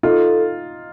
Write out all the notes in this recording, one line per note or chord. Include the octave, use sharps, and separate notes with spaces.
D#4 F4 A4